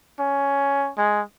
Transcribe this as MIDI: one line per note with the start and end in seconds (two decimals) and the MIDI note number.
0.20 0.90 61
0.97 1.22 56